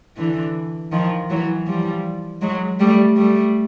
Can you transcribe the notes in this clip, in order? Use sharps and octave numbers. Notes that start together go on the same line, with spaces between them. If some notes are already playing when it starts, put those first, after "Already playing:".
D3 E3
D#3 F3
E3 F#3
F3 G3
F#3 G#3
G3 A3
G3 A3